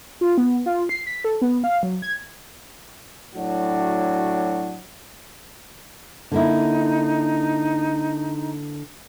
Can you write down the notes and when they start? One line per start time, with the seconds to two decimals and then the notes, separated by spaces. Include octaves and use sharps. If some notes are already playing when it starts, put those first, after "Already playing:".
0.21 F4
0.38 B3
0.66 F4
0.89 C7
1.07 B6
1.24 A4
1.42 B3
1.64 F5
1.83 F#3
2.02 G#6
3.35 A2 F#3 D4 F#4
6.32 D3 A#3 D#4 E4